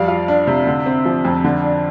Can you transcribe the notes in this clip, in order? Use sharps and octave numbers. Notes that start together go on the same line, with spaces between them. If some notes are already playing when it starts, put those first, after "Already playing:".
Already playing: F2 G3 D5 F5
F4
D4
C3
D3
C4
F3
F2
D3
D4